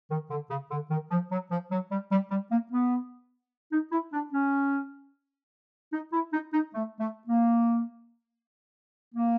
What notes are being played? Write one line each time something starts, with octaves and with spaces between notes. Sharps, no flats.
D#3
D3
C#3
D3
D#3
F3
F#3
F3
F#3
G3
G3
G3
A#3
B3
D#4
E4
D4
C#4
D#4
E4
D#4
D#4
A3
A3
A#3
A#3